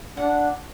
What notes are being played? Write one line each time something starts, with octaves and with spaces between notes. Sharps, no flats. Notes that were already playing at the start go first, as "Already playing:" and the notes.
D4 F#5